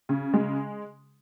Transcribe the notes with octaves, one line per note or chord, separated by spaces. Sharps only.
C#3
G#3